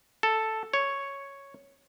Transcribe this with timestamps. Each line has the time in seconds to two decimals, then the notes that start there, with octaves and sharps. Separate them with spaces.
0.23 A4
0.74 C#5